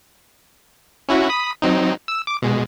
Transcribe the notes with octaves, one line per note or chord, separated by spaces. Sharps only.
C#4 E4 F#4
B5 D#6 B6
F#3 C4 D#4
E6
D6
B2 G#3